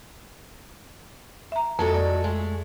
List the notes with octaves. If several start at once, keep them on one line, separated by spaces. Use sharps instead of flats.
E5 A#5
F2 F#3 G#3 A4
D5
G#3 A3